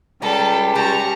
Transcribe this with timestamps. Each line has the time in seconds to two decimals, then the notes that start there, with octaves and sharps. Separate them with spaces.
0.22 C#2 G3 G4 A4 A#5
0.76 G4 A5 A#5 C#6